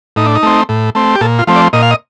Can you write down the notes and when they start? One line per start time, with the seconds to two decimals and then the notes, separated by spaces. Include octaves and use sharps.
0.16 A2 D#4
0.26 D4
0.35 D#4
0.43 A3 C4
0.69 A2
0.95 A3 C4
1.15 G4
1.21 A#2 A4
1.39 F4
1.47 F3 A3 C4
1.56 D5
1.73 A#2 D#5
1.82 F5
1.91 D#5